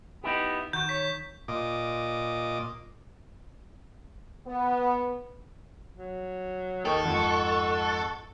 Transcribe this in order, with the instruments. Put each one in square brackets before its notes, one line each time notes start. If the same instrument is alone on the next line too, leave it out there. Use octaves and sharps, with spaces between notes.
[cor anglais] B3 [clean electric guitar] D#4 E4 G4
[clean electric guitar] D#3 [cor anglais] F#4 [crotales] G6
[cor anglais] C#5 [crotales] B6
[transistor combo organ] A#2 D#5 D6
[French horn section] B3
[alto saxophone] F#3
[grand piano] D#2 G5 F7 [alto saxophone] D#3 [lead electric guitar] A4 [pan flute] C#6
[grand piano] F2 G#2 [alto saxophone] F#5